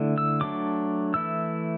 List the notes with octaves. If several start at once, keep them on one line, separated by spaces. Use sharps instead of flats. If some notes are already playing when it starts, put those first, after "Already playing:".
Already playing: D3 A3 E4
E6
F#3 A3 D4 D6
E3 A3 E4 E6